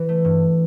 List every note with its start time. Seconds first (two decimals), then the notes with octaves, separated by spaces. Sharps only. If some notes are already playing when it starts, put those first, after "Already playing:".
Already playing: E3
0.09 A3
0.25 G2